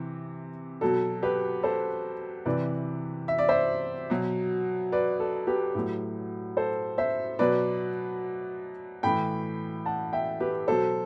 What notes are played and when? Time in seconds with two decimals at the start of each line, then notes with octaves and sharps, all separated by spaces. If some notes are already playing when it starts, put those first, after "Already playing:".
Already playing: C3 E3
0.81 B2 F#3 A4
1.23 G4 B4
1.63 A4 C5
2.45 C3 E3 B4 D5
3.28 E5
3.38 D5
3.49 C5 E5
4.10 B2 F#3
4.92 B4 D5
5.20 A4
5.47 G4 B4
5.75 A2 F#3
6.57 A4 C5
6.98 C5 E5
7.39 B2 F#3 B4 D5
9.03 A2 E3 G5 B5
9.86 F#5 A5
10.13 E5 G5
10.40 G4 B4
10.68 B2 F#3 A4 C5